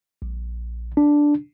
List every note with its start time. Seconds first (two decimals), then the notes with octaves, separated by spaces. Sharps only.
0.22 A#1
0.97 D4